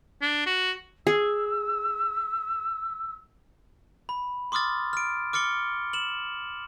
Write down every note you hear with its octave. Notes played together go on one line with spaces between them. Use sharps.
D4
F#4
G#4 E6
B5
C6 D6 D#6 F6 A6
F6 D7
D6 F6 A6 C#7 G7
E7 F#7